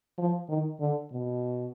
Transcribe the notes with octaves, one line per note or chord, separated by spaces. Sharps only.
F3
D#3
D3
B2